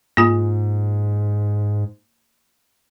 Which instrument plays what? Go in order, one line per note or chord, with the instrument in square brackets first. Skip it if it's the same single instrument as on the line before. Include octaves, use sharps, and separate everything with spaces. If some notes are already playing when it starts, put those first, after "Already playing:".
[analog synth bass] G#2 [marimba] A#3 F4